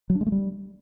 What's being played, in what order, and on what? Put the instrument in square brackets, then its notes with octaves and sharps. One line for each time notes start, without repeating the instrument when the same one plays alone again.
[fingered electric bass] F#3
D4
G#3
A3
G3